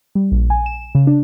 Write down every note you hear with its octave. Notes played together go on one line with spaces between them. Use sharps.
G3
A#1
G#5
E7
C#3
D4